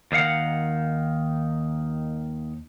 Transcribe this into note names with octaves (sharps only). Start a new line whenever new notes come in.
D#2 D#3 F5 F#5